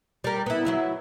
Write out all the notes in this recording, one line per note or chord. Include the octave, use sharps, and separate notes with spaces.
G3 A#4
B3 E4
F#3 E4 E5